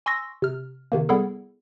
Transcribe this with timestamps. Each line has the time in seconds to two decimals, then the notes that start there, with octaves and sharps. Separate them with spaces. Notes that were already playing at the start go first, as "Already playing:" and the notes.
0.06 G#5 C6 C#6 E6 A#6
0.42 C3 F6
0.92 C3 D#3 A#3
1.09 G3 B3 E4 G#4 A4